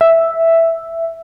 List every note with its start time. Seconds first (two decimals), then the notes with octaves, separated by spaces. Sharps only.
0.01 E5